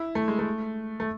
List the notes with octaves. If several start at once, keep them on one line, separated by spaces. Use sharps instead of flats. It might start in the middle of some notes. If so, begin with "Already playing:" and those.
Already playing: E4
A3
G#3
A3
A3